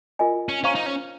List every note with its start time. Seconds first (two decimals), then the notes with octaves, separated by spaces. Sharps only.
0.19 F4 A#4 D#5 G#5
0.49 C#4
0.64 C#4 C5 F5 A#5 C#6
0.75 D#4
0.86 C#4